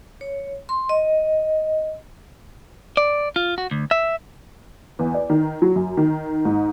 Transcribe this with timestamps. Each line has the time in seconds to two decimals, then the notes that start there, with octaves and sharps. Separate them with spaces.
0.21 C#5
0.69 C6
0.89 D#5
2.97 D5
3.36 F4
3.58 F#4
3.71 D2
3.91 E5
4.99 E2
5.14 D5
5.30 D#3
5.62 F#3
5.76 F#2
5.97 D#3
6.45 G#2